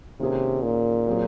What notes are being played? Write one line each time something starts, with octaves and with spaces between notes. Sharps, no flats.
C3 D#3 A#3 C#4 G#4
A#2
F#3 C4 F4 G#4